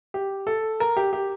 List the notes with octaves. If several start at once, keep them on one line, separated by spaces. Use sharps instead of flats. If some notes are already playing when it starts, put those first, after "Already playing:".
G4
A4
A#4
G4
G4